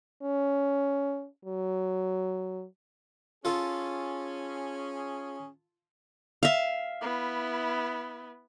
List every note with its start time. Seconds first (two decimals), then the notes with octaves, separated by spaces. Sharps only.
0.22 C#4
1.45 F#3
3.45 C#4 F4 G#4 A4
6.43 E5 F5
7.01 B3 E4